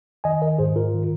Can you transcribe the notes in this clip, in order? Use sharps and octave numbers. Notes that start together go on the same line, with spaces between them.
D#3 D#5 G#5
A#4 D#5
G#2 G#4 C5
F4 A#4
D#3